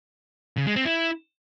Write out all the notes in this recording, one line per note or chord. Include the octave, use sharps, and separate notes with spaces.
C#3
G#3
C4
E4